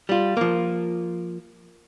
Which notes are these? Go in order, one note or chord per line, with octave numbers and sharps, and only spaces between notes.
G3 F4
F3 A#3